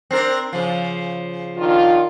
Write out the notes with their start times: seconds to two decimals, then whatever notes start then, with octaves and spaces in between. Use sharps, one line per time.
0.11 C4 D4 A#4
0.53 C#3 F3
1.57 D#3 D4 F4